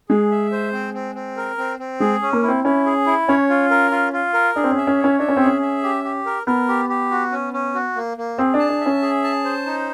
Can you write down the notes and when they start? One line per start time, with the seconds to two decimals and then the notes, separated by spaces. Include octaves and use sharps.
0.09 G#3 G#4
0.31 E5
0.52 C5
0.73 C4
0.94 C4
1.15 C4
1.37 A#4
1.58 C4
1.79 C4
2.00 G#3 G#4
2.22 C#4
2.33 A#3
2.43 E4
2.48 C4
2.64 C#4 E4
2.85 G#4
3.07 E4
3.28 C#4 C#5
3.50 F4
3.71 A#4
3.91 F4
4.13 F4
4.34 A#4
4.55 D4 G#4
4.64 C4
4.71 C#4
4.77 E5
4.87 C#4
4.98 C#5
5.04 C#4
5.19 D4 E5
5.29 C#4
5.37 C4
5.41 G#4
5.46 C#4
5.62 E5
5.83 G4
6.04 G4
6.26 A#4
6.47 B3 A#4
6.68 G4
6.89 G4
7.11 F#4
7.32 C#4
7.53 C#4
7.75 F#4
7.96 A#3
8.17 A#3
8.38 C4 G#4
8.54 D4
8.59 A5
8.70 D4
8.81 E5
8.86 C#4
9.02 G#4
9.24 A5
9.45 C5
9.66 D#4